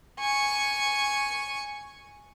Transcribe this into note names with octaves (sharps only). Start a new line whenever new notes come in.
G#5 C#6